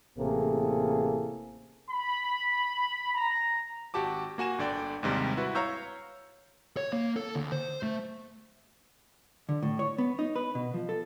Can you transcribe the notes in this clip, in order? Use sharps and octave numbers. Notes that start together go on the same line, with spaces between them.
A1 C3 A#3 G#4 A4
B5
A#5
G#1 F#4 G4 A5 D6
A#3 F#4 G#5 E7
G1 D3 D5 G5
D#2 G#2 C3 G3
E4 F#4 B4
C#5 F5 A#5 C#6 E6 G6
C#5
A#3
A4
D2
C5
A3
D3
A2
C#5
B3
D#4
B4
B2
F3
A4